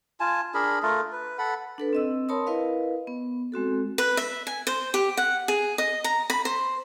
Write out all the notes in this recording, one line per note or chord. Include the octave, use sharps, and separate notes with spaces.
F4 G#5 A5
D4 G#4 A#4 B5
A3 F4 A4 A#4
B4
A4 F#5 B5
D4 A4 B4
C4 D#5 E6
A#4 C#5 A5 B5 C6 D#6
E4 A#4 B4 D#5 F5
B3
G#3 C4 F#4 A4
B4
E5
G#5
C5
G4
F#5
G#4
D#5
A#5
B5
C5